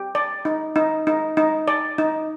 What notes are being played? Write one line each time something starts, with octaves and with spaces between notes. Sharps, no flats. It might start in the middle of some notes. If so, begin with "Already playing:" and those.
Already playing: G4
D5
D#4
D#4
D#4
D#4
D5
D#4